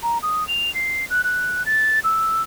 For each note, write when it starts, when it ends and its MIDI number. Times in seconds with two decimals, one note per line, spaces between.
0.03 0.18 82
0.22 0.46 87
0.48 0.73 101
0.74 1.05 96
1.10 1.22 90
1.24 1.65 90
1.66 1.99 93
2.04 2.42 88